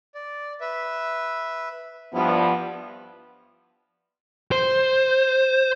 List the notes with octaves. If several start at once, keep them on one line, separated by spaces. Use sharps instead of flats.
D5
B4 E5
G2 F3 B3 E4
C5